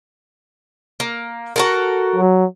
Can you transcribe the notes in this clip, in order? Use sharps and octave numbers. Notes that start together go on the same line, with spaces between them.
A#3
F#4 A4 A#4
F#3